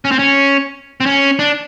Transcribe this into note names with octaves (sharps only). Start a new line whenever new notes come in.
C#4
C4
C#4
C4
C#4
D4